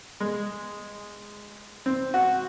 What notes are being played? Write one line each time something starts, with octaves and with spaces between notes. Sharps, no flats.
G#3
C4
F#4